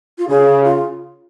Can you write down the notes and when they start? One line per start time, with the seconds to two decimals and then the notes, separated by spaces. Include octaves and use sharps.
0.18 F4
0.29 C#3 G#4
0.64 F4